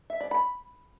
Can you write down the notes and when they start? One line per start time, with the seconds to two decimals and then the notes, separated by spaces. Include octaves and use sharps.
0.10 E5
0.20 D5
0.31 B5